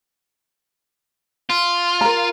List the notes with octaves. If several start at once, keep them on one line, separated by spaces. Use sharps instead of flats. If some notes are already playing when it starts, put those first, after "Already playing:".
F4
A#4 A#5